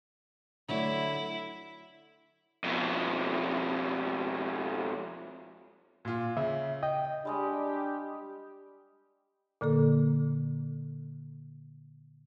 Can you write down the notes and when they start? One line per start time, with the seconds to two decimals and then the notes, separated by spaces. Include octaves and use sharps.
0.69 D3 F#3 A3 E4
2.64 F2 B2
6.05 A#2 F4
6.37 C#3 E5
6.83 D#5 G5
7.25 G3 G#3 D4 G4 D#5
9.61 A#2 D3 A#3 A4